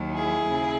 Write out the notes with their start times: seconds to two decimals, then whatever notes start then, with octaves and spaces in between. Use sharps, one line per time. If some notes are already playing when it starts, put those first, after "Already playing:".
Already playing: D#2 D#3 F#3
0.13 E4 G#4
0.47 D#2 C#3